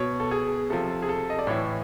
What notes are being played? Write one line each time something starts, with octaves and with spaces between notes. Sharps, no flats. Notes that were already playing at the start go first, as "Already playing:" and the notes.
Already playing: B2 C#5
A4
G#4
C3 F3 A4
G#4
A4
D#5
D5
A2 E3 C#5